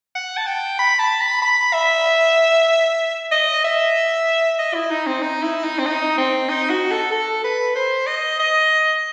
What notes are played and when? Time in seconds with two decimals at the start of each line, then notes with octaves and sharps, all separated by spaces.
0.15 F#5
0.37 A5
0.47 G5
0.79 B5
0.99 A5
1.21 B5
1.42 B5
1.73 E5
3.32 D#5
3.65 E5
4.59 D#5
4.74 E4
4.91 D#4
5.07 C4
5.22 D#4
5.43 E4
5.64 D#4
5.79 C4
5.86 D#4
6.18 C4
6.49 D#4
6.70 F#4
6.91 A4
7.12 A4
7.44 B4
7.76 C5
8.07 D#5
8.40 D#5